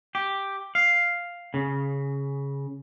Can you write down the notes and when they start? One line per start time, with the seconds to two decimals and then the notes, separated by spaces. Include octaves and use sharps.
0.15 G4
0.75 F5
1.54 C#3